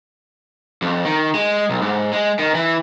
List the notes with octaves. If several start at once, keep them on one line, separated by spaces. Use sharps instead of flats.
F2
D#3
G#3
B1
G#2
G#3
D#3
E3